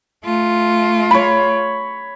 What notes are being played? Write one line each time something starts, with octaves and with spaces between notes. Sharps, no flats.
A3 F4
C#5 B5